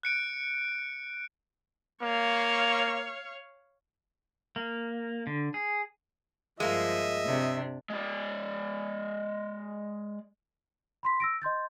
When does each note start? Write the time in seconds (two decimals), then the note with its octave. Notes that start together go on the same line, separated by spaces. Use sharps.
0.03 F#6 C#7 D7
2.02 A#3 C#5 F5
4.56 A#3
5.27 D3
5.54 G#4
6.60 G2 F3 G#3 A#3 D#5 E5
7.26 C3 D4
7.90 G#3 D5
11.03 B5 C6 B6
11.20 E6 A#6 D7
11.42 D#5 C6 G6 A6